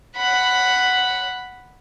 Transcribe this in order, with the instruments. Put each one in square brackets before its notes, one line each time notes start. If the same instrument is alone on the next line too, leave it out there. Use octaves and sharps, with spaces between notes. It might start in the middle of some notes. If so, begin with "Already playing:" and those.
[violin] F#5 B5